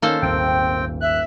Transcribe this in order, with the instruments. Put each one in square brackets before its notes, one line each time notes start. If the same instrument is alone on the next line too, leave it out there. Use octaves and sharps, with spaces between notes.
[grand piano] D#3 C#4 [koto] A#3 A4 C5
[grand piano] D#1 G#1 D7 [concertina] C4 G5
[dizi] E5 [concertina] F#6